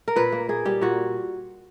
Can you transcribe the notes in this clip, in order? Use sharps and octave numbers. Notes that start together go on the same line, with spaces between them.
A#4
A#2 B4
A#3
A#3 G#4
G3 G4
A#2 F#4